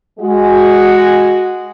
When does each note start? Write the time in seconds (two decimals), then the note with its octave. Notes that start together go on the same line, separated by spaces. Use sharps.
0.19 G#3 F#4